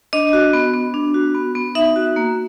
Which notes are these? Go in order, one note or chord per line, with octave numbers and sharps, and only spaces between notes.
D4 D#5
F#4
B3
B3
D4
F#4
B3
B3
D#4 E5
F#4
A#3